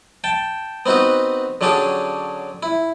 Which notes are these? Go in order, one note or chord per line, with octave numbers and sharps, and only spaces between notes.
G5 A5
B3 C4 D#4 F#4 B4
D3 F#3 C#4 D4 G4 G#4
E4